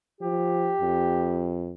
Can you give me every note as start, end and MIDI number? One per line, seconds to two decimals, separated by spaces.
0.21 0.73 53
0.21 1.64 67
0.81 1.74 41